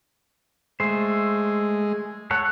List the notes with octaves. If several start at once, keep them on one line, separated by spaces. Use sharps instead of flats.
G#3 A3 C5
A4 C#5 F#5